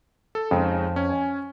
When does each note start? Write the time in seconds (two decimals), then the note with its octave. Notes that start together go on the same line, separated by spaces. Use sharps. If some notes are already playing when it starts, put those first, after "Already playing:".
0.35 A4
0.51 F2 C#3 G#3 D#4
0.96 C#4 G#5